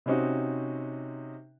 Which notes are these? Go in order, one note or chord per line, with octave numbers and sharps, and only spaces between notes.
C3 C4 C#4 D#4 F#4